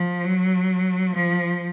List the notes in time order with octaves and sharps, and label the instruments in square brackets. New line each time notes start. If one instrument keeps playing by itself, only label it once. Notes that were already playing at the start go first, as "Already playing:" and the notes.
Already playing: [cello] F3
F#3
F3